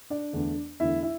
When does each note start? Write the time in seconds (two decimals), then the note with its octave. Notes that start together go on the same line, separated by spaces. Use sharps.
0.10 D4 D5
0.33 E2 D3 A3
0.80 E2 D3 A3 E4 E5
1.03 E4 E5